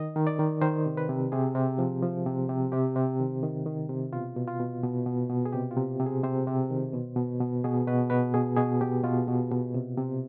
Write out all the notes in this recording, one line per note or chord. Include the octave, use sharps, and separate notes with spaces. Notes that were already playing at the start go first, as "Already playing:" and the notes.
Already playing: D#3 D#5
D#3
D5
D#3
D#3 C5
C3
B4
C3
C3 G#4
C3
F3
F3
C3
C3
C3 G4
C3
D#3
D#3
D#3
C3
B2 F4
B2
F4
B2
B2
B2
B2
G#4
C3 G4
F4
C3
C3
G#4
C3 C5
C3
D#3
B2
B2
B2
B2 G#4
B2 B4
B2 B4
B2 G#4
B2 G#4
B2 G4
B2 F4
B2
B2
C3
C3